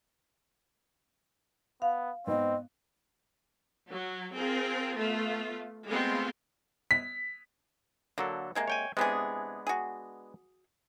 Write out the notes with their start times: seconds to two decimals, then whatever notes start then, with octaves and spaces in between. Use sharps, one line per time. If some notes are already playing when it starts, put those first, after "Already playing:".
1.82 B3 F5
2.27 G#2 B3 C4 D#5
3.89 F#3
4.35 C4 F4 G#4 A#4
4.96 A3 B3 F4
5.88 G#3 A3 B3 C4 F4
6.91 B6
8.18 D3 F#3 A#3 A4
8.55 C3 G#3 A#3
8.68 C#5 G5 G#5
8.97 C3 E3 G#3 B3 D4 G#4
9.67 F#4 G#4